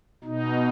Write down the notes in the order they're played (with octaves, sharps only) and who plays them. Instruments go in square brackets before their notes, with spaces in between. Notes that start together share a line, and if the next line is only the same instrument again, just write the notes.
[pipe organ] B2 D#4